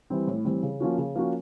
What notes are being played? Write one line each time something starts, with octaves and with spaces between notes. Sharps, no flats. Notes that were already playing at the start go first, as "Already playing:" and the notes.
E3 G3 C4
A2
E3 G3 C4
C#3
F3 A#3 C#4 F#4
C#3
F3 A#3 C#4 F#4